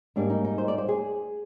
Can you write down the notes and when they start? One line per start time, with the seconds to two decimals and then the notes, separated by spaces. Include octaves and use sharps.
0.16 G#2 G3 A#3 D4
0.30 D#4
0.44 D#4
0.58 C5
0.68 D5
0.78 C5
0.88 G#4